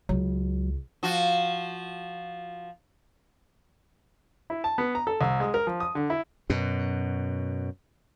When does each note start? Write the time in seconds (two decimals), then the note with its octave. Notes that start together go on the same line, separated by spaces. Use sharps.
0.09 C#2 F#3
1.03 F3 F#4
4.50 E4
4.64 A5
4.78 B3
4.95 A#5
5.07 A4
5.21 C2
5.40 G#3
5.54 A#4
5.67 F3
5.80 D#6
5.95 D3
6.10 E4
6.50 F#2 B2